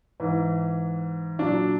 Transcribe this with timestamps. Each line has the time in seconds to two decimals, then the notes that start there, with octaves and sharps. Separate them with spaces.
0.20 G#2 E3
1.39 A#2 F#3 D4